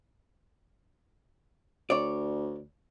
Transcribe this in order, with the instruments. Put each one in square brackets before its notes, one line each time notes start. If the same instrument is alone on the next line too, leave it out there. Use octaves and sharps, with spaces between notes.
[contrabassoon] D2 [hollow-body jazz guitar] C#5 D5